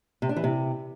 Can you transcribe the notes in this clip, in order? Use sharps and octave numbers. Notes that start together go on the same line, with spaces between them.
C3
D4
E3
C3